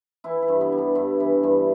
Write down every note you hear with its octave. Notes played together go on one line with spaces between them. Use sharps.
E3 E4
E4
G2
B3
G3
D4
G2 E4
E3
G2